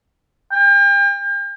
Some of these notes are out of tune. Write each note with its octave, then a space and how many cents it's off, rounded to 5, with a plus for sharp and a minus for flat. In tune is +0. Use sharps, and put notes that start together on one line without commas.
G5 +40